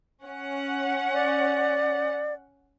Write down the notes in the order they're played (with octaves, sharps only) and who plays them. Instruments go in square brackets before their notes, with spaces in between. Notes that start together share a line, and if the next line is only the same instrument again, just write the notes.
[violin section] C#4 F#5
[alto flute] D5